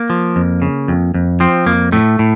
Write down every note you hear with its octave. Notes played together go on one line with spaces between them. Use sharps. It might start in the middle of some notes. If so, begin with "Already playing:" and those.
Already playing: A#3
F3
F2
C#3
F2
F2
F3 C4
F2 A#3
A2 A3
A2